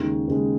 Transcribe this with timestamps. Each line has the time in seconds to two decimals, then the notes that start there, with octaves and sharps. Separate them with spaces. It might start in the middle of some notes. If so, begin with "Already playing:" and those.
Already playing: D#2 C#3 G#3
0.28 D#2 C#3 G#3